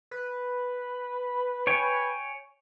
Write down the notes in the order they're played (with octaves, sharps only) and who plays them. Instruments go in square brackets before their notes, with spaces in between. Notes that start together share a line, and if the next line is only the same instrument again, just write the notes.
[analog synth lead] B4
[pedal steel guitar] C#5 G5 G#5